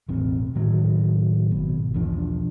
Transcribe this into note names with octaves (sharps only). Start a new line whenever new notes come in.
E1 A1 C4
A2 D#3 F#3
G#1 B2
B1 E2 F3 D4